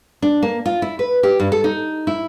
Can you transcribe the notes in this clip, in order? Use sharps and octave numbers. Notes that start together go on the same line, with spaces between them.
D4
A#3
F4
E4
B4
G4
G2
A4
D#4
E4